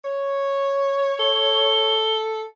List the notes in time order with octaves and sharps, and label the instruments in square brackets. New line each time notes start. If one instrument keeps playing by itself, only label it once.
[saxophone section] C#5
[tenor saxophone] A4 [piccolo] G7